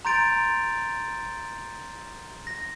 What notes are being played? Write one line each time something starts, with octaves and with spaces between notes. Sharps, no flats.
A#5 C6 G6 A6 D7 F7
A#6